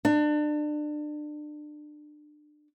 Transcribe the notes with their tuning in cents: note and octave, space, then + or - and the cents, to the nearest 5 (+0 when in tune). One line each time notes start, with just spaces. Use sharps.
D4 +30